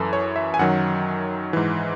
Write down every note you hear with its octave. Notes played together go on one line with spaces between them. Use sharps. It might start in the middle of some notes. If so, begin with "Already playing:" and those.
Already playing: F#2 E3 A4
C#5
E5
G#5
F#2 D#3 F#3 F#5
G#2 E3